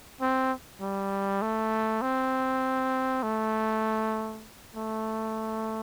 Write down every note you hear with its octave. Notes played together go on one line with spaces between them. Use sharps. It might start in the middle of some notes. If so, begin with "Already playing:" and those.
C4
G3
A3
C4
A3
A3